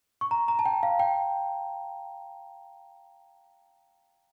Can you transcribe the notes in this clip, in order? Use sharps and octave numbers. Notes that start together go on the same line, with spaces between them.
C#6
A#5
A#5
A5
G5
F5
G5